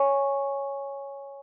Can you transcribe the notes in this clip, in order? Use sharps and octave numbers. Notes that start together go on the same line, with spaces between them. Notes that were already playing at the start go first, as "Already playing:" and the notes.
Already playing: C#5 G#5 C#6